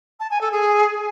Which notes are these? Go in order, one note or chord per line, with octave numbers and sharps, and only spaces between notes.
A5
G#5
A4
G#4